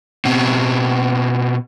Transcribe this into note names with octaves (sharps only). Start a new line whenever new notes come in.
B2 C4